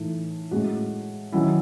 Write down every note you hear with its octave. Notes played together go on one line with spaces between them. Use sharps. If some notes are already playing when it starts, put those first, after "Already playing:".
Already playing: A2 E3 A3 D#4
A2 G#3 C#4 F#4
D#3 F#3 C#4 E4